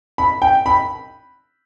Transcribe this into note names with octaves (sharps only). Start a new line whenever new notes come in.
B5
G5
B5